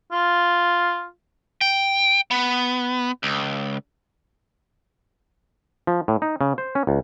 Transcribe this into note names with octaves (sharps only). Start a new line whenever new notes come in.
F4
G5
B3
C#2
F3
A2
D#4
C#3
C5
C#4
C#2